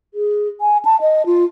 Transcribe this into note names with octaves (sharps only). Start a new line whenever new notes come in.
G#4
G#5
A5
D#5
F4